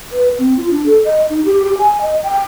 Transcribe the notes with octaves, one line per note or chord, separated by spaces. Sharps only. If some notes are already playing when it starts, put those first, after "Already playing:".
B4
C4
F4
D4
A4
D#5
D#4
G4
G4
G#5
D#5
G5